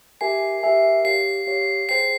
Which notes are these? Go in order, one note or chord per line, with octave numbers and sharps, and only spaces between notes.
G4 A#4 E5 G#5 C7
G4 A#4 E5 G#5
G4 C#5 F5 C7
G4 C#5 F5
G#4 C5 G5 C7